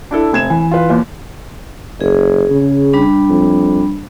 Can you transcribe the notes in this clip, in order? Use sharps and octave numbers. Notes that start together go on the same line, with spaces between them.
D4 E4 A4
F1 G#6 E7
E3 G#5
F4 B4
D#2 A#2
F#1 G#4
C#3
G3 D4 B5
F2